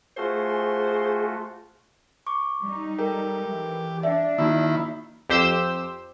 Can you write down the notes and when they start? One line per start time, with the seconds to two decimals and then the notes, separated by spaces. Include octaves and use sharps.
0.17 A3 F4 F#4 G#4 C5
2.27 C#6 D6
2.63 G3 D#4
2.98 G4 A4 A#4
3.47 E3
4.03 D4 D5 E5
4.38 D#3 A#3 D#4 E4 F#4
5.29 F2 G4 C5 E6 G6 E7